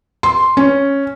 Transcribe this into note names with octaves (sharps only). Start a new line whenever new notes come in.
C6
C#4